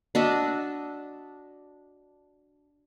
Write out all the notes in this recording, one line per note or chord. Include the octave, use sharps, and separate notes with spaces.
D4 F#4 D#5 E5